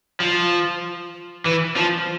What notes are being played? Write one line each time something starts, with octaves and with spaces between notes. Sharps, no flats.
F3
E3
F3